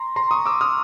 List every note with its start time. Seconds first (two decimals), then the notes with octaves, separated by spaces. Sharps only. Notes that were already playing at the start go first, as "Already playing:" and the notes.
Already playing: A#5 C6
0.16 A#5 C6
0.31 C#6 D#6
0.46 D6 E6
0.61 D#6 F6